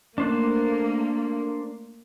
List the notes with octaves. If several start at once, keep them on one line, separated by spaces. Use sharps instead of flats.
A3 A#3 D4 C5 F#6